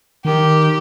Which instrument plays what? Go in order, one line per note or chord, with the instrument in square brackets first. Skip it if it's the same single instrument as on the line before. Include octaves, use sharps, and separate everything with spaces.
[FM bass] D#3 [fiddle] G4